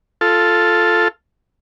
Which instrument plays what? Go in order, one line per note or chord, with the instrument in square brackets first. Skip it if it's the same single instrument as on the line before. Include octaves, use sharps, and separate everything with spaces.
[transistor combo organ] F4 A4